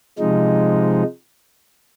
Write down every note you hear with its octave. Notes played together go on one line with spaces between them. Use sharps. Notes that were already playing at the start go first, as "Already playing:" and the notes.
C3 F3 G#3 D#4